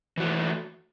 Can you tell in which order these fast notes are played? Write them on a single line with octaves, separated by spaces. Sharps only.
E3 F#4 A3